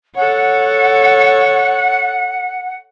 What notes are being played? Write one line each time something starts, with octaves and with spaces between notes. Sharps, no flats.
A4 C#5 F#5